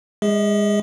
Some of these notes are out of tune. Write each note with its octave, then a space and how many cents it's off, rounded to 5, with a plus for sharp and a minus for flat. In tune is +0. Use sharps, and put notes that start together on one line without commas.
G#3 -30 G#4 -25 D#5 +45